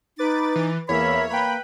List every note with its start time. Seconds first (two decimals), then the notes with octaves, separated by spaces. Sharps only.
0.18 D#4 B4 D6 A6
0.56 E3
0.89 E2 A#3 A#4 C#5 E5 B5
1.30 A#3 B4 G5 B5